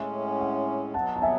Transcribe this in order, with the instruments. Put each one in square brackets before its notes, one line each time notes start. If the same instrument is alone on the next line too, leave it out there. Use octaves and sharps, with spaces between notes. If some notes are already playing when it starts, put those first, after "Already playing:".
Already playing: [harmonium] A2 G#3 C#4 [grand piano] E5
[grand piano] F#5
[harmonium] B2 F#3 B3 [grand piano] F#5 A5
[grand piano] A5
E5 G#5